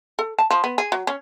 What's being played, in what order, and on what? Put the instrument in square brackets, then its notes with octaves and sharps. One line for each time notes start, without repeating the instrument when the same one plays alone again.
[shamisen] A4
A5
F3
B3
G#4
F#3
C#4